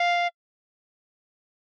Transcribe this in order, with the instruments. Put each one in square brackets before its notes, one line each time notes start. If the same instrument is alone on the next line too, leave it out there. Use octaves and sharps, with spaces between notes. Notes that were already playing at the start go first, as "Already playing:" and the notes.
Already playing: [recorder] F5